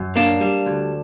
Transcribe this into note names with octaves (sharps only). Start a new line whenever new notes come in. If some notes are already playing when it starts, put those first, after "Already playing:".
Already playing: F#2
A#3 D4
G3
D2